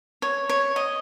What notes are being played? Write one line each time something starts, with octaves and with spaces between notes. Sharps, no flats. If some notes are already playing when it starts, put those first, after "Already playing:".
C#5
C#5
D#5